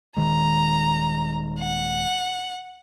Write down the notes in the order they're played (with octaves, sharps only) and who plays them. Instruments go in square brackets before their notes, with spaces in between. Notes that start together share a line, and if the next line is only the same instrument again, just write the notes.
[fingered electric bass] D#1 D#3 G#3 [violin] A#5
[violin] F#5